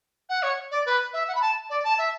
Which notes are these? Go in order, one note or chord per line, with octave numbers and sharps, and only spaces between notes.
F#5
C#5
D5
B4
E5
F#5
B5
A5
D5
A5
E5